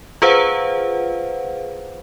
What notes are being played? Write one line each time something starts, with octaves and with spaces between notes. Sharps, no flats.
F4 G#4 B4 C5 F5 F#5